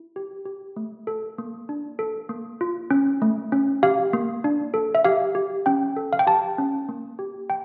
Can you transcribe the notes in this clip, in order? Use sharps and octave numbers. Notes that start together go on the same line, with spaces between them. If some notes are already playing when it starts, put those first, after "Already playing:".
Already playing: E4
G4
G4
A3
A4
A#3
D4
A4
A#3
F4
C#4
A3
C#4
G4 F5
A#3
D4
A4
E5
G4 F5
G4
C#4 G5
A4
F5
G5
G4 A5
C#4
A#3
G4
G5